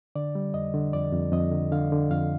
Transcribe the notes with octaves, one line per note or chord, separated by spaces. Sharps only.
D3 D5
G3
F2 D#5
D3
F2 D5
F2
F2 D#5
D3
D3 F5
D3
F2 F5